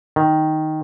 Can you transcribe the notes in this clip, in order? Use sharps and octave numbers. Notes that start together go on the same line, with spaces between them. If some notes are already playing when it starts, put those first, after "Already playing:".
D#3